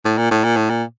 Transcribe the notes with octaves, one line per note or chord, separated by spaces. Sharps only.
A2
A#2
A2
A#2
A2
A#2